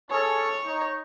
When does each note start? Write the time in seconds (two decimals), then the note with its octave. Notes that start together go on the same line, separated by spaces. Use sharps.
0.11 C#4 G#4 A4 C#5
0.65 D#4